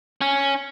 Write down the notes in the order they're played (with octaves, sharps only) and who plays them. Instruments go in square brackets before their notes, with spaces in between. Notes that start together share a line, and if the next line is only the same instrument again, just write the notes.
[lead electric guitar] C#4